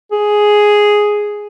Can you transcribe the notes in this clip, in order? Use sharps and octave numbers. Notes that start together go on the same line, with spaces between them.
G#4